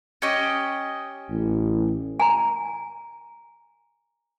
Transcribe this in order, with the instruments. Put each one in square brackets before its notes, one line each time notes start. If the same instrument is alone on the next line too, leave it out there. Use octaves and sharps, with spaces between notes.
[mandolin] C#4 G4 D#5
[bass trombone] A1
[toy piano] G#5 A#5